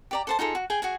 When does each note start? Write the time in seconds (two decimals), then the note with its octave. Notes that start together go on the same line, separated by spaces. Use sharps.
0.11 G4 D5 A#5
0.27 A4 C5 A5
0.39 D#4 F4 G#4 A4
0.55 F#4
0.70 G#4 G5 G#5
0.82 F#4 G#4 G#5